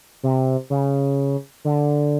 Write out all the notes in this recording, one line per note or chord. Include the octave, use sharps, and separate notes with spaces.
C3
C#3
D3